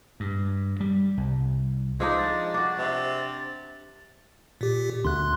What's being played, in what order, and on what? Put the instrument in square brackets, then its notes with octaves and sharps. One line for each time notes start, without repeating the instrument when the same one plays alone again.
[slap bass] G2
G3
C2
[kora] F3 D4 D#4 [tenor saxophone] G#3 [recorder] E6
[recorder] A6
[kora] D4 F#4
[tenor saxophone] C3
[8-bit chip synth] A#2 G4
[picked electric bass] D2 [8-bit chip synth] C6 F#6